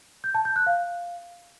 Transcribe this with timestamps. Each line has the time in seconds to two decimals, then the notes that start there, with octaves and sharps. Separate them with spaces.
0.24 G6
0.35 A5
0.45 G6
0.56 F#6
0.67 F5